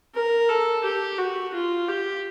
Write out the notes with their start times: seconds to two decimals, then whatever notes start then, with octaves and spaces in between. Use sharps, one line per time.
0.14 A#4
0.49 A4
0.83 G4
1.18 F#4
1.54 F4
1.88 G4